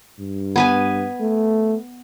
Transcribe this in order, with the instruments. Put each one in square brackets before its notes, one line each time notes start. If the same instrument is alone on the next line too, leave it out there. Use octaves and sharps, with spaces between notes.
[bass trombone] G2
[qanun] B3 B4 G#5
[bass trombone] A3